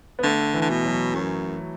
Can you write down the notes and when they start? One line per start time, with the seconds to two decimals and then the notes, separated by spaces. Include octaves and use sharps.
0.19 B3
0.23 D3 A3
0.54 E3
0.62 D3
0.70 B2
0.85 F#3
1.15 F#2